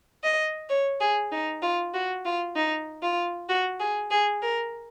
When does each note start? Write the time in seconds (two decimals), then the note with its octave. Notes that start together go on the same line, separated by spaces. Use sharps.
0.24 D#5
0.69 C#5
1.01 G#4
1.32 D#4
1.63 F4
1.94 F#4
2.25 F4
2.56 D#4
3.03 F4
3.49 F#4
3.80 G#4
4.11 G#4
4.42 A#4